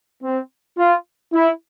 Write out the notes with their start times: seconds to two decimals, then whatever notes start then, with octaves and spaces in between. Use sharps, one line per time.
0.23 C4
0.78 F4
1.33 E4